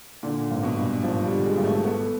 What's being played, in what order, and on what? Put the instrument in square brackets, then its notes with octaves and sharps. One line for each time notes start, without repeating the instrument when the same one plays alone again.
[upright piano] A#2 [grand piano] D3
[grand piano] G#1
[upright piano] B2
[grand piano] G2
[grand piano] G#1 [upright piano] F3
[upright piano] G3
[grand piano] D3
[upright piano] G#3
[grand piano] G#1
[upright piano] A3
[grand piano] A3 [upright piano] B3